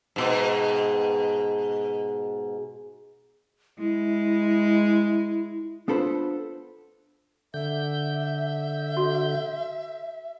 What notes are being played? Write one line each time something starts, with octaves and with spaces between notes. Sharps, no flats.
G#2 B2
G#3 E4
B3 D4 F4 A4 B4 C5
D3 E5 G6
F#4 A4